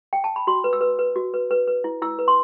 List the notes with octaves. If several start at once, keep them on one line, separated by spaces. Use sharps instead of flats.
G5
A5
B5
F#4 C6
B4
E6
B4
B4
F#4
B4
B4
B4
E4
E4 E6
B4
C6